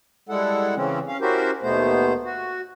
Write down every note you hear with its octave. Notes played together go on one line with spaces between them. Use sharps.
G3 G#3 E4 A4 F#5
C#3 E3 C4 C#4
C#4 F5
C#4 E4 F#4 G4 A#4 C5
D#2 B2 A3 B3 C5
F#4